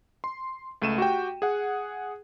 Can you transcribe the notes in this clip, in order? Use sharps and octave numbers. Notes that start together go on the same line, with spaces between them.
C6
C#2 A3 D#7 E7
F#4 G4 G5
G#4 F#5